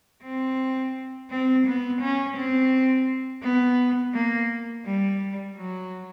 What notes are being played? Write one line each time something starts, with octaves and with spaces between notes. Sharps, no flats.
C4
C4
B3
C#4
C4
B3
A#3
G3
F#3